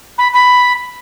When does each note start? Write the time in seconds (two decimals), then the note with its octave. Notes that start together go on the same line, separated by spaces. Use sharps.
0.18 B5
0.33 B5